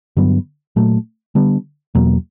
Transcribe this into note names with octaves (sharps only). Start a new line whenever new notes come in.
G2 D3 F#3 B3
A#2 F#3 A3
D3 G3 B3 D4
E2 B2 F#3 A#3